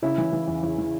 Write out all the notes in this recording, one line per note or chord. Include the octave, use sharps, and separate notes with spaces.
C#3 E4
E3
E3
E2
E2
E3